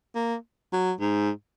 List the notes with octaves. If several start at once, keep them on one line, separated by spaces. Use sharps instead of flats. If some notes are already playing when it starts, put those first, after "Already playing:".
A#3
F#3
G#2